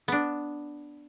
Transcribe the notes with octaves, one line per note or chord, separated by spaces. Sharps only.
B3 D4